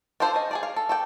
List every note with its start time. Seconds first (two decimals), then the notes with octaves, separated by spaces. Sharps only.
0.20 D4 F4 A4 C5
0.34 C#4 D#5
0.51 G#4 A4 D5
0.63 F5
0.76 A4
0.89 A4 D5 G5